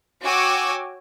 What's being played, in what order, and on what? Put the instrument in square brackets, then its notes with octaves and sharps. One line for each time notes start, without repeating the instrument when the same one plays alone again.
[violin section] F#4 C#5 G5 G#5 D6 E6